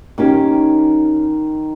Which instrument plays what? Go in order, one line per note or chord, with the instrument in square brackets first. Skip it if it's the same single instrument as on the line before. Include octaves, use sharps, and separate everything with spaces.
[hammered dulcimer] D#3 [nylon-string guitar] A#3 C#4 G4